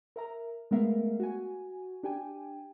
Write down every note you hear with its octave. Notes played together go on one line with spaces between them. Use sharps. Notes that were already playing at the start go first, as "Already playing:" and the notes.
A#4 E5 A#5
G#3 A3 B3 A#4 E5 F5
F#4 G#5
D4 G4 G5 G#5